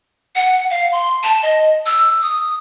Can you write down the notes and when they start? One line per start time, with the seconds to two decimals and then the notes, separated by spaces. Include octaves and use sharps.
0.36 F#5
0.70 F5
0.92 C6
1.23 A5
1.43 D#5
1.86 E6
2.22 D#6